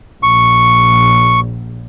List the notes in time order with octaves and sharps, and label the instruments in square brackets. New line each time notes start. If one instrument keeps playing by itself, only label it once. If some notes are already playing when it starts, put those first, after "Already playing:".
[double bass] A#1 [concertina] C#6